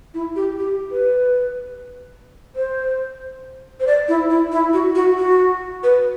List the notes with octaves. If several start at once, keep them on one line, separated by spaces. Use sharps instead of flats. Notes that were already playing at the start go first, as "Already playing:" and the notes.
E4
G4
G4
B4
C5
C5
D5
E4
E4
E4
F#4
F#4
F#4
B4